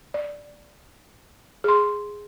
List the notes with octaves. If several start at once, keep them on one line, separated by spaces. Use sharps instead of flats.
D5
G#4 C6